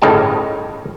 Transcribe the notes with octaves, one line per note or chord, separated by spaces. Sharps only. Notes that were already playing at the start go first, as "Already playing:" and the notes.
G1 A2 C#3 D#4 G4 A5